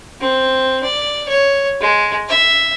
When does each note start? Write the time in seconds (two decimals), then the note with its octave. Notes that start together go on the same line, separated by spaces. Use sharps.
0.21 C4
0.84 D5
1.29 C#5
1.81 G#3
2.29 E5